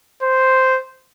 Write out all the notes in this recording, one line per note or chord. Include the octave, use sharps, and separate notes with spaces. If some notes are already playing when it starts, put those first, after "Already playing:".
C5